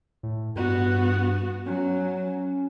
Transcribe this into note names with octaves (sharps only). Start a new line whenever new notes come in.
A2
G2 B3 F#4
F#3 C#4